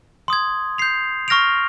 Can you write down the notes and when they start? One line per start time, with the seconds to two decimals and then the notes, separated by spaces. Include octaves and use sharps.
0.28 C6 D#6 G#6
0.78 G6 C7 F7
1.28 C#6 F6 A#6 D7 F7